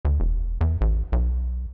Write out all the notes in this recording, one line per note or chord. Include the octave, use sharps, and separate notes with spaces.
D2
E1
E2
A1
B1